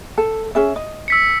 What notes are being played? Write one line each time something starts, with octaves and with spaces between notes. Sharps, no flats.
A4
C#4 G#4 E5
D#5
E6 B6 C#7